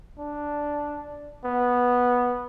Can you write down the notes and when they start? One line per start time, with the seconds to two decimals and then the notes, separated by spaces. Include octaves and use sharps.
0.19 D4
1.45 B3